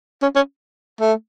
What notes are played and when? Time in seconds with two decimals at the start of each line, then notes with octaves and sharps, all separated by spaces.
0.22 C#4
0.36 C#4
1.01 A3